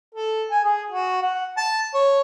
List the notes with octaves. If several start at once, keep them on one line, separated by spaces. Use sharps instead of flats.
A4
G#5
G#4
F#4
F#5
A5
C#5